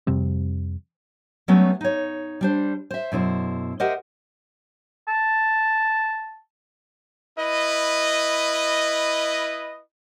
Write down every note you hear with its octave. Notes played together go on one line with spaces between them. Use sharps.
F2 C3 G3 C4
F#3 G3 A3 B3 C#4
D#4 C#5
G3 D4 C5
C5 E5
F#2 B2 E4 C5
G4 A#4 C5 D#5 E5 F#5
A5
E4 B4 D#5